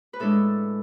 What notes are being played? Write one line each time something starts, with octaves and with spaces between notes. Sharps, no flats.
B4
A2 G#3 D4 A4